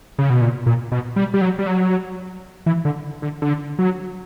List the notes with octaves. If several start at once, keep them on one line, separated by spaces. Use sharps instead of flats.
C#3
B2
A#2
A#2
B2
G3
G3
F#3
G3
F#3
E3
D3
D3
D3
F#3